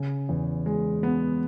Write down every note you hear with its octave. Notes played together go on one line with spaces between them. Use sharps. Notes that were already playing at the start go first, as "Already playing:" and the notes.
Already playing: C#3
E2
G#3
B3